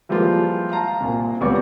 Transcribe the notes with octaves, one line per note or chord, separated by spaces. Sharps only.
E3 F3 G3 G#3 A#3 F4
F5 A5 A#5
C2 A#2
C#2 G3 B3 D5 C#6